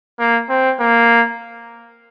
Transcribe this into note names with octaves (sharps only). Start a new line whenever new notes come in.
A#3
C4
A#3